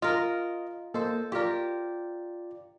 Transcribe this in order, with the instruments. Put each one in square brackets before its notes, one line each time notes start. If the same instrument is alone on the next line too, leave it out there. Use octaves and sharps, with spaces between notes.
[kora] F4 A#4 [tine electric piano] D#5
[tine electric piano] A#3 D#5 [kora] A4 C5
[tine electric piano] F4 D5 [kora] G4 A#4